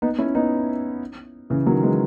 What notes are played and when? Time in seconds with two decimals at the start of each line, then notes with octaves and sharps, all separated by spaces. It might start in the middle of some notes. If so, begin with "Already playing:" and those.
0.02 B3 D#4
0.18 C#4 E4
0.35 B3 D#4
1.50 C#3 E3
1.66 D#3 F#3
1.83 E3 G#3